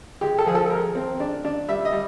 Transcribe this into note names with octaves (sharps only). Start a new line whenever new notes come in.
G#3 G4
A4
F3 G#4
A4
A4
G#3 A#4
C4
D4
D4
G3 E5
D#5
G3